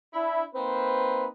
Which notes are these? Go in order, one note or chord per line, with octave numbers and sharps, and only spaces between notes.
D4 E4
A#3 C4 D#4 B4 C5